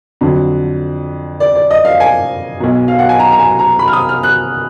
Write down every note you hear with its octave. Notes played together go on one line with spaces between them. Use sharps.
F2 D3 F#3
D5
D5
D#5
F5
G#5
B1 B2 F#3
F5
F#5
G#5
A#5
A#5
G#5
A#5
B5
F6
D#6
F6
F#6